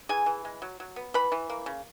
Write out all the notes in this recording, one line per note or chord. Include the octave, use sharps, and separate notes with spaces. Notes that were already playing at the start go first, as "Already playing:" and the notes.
E3 G#4 G#5
E3
G#3
F#3
F#3
B3
E3 B4 B5
E3
A#3
C#3